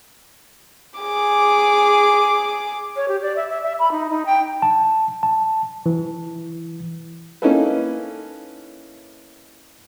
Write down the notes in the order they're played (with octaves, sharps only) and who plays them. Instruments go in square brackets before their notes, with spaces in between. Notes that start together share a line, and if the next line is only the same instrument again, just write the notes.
[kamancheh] G#4 D6
[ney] C#5
G4
D5
E5
E5
E5
B5
D#4
D#4
G5
[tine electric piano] A5
A5
E3
[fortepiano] A#3 C#4 D#4 E4 A4 B4